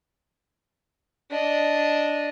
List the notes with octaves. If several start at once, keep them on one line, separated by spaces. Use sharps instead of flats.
D4 D#5